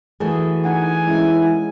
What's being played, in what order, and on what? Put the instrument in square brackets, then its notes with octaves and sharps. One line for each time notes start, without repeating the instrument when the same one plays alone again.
[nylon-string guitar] E3 A3 F#4 [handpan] G#4
[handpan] D#4 F#5 [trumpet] G#5
[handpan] G#3 C#4 [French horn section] E4